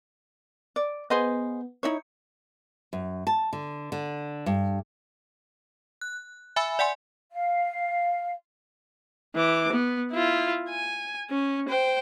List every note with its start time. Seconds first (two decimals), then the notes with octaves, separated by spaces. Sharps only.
0.76 D5
1.10 B3 G#4 C5 D#5
1.83 D#4 E4 C#5
2.93 F#2
3.27 A5
3.53 D3
3.92 D3
4.46 G2
6.01 F#6
6.56 E5 G#5 B5 E6
6.79 D5 F#5 G#5 C6
7.32 F5
9.35 E3 D6
9.72 B3
10.12 E4 F4
10.70 G#5
11.30 C#4
11.68 C5 G5